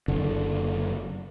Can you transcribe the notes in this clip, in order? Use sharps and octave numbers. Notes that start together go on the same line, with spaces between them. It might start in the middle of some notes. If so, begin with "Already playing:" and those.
F#1 D3